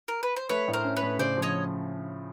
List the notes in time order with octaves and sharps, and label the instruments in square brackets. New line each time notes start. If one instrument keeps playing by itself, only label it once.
[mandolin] A#4
B4
C5
[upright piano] A3 [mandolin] B4 C#5
[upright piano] A2
[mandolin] A#4 C5
[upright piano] C#4
[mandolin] B4 C#5
[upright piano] A2
[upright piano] C#3 [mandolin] C5 D5
[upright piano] F3
[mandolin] C#5 D#5